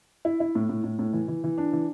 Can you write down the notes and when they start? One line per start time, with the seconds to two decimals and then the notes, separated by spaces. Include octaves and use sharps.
0.25 E4
0.40 E4
0.55 A2
0.69 A2
0.84 A2
0.99 A2
1.13 E3
1.28 E3
1.44 E3
1.58 D4
1.73 E3